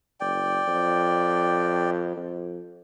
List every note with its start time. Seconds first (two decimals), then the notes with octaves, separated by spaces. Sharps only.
0.20 F#1 D5 G5
0.68 F2
2.16 F2